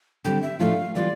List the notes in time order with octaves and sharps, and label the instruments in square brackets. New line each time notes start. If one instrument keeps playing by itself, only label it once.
[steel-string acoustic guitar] D3 G3 C4 [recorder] G5
[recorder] E5
[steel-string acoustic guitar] A2 F3 A3 D4 F4 [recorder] F5
[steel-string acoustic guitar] E3 G3 B3 F4 [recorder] D5